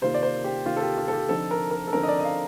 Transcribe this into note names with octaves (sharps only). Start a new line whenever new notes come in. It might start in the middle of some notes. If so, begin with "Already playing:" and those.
C3 D#3 A#3 F4 C5
D5
C5
G4
C3 D#3 A#3 F4
A4
G4
F4
A4
G4
D3 F3 C4 D#4 A4
A#4
A#4
A4
D3 F3 C4 D#4 A#4
D#5
D5
D#5
F5